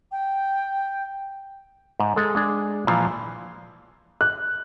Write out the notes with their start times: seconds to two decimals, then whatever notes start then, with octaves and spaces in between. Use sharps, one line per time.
0.12 G5
2.00 G#2
2.16 G#3 A4
2.35 G#3 D4 G#4
2.87 A#2 E3 F3 F5
4.21 F#6